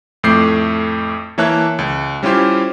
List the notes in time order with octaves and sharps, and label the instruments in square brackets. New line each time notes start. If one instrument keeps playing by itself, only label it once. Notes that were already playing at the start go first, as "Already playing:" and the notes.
[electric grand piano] F2 A2 A3 D6 G6 C7
E3 A#3 C#5 E5 A5 F#6
C#2
G3 C#4 E4 F4 G4 C5